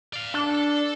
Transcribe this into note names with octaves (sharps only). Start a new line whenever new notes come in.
D5 F5
D4 A4